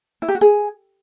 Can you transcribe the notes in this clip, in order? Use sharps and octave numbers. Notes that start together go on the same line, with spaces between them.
E4
G4
F#4
G#4